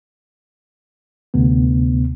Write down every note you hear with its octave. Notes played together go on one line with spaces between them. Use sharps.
D2 C3 B3